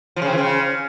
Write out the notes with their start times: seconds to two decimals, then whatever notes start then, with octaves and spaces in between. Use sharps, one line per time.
0.16 F3
0.22 C#3
0.27 C4
0.32 E3
0.38 C#3